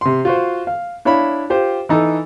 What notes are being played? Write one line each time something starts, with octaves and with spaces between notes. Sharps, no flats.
C3 C6
F4 F#4 C5
F5
D4 E4 C#5 F5 B5
F4 G4 C5
E3 D#4 A4